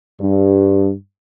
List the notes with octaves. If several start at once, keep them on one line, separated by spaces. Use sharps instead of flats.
G2